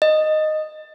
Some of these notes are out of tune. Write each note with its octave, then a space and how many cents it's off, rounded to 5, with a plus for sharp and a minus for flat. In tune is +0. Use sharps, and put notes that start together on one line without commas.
D#5 -5